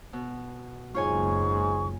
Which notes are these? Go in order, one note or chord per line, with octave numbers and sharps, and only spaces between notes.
B2
F#1 C#2 G#2 F4 G#4 C#5 G#5 C#6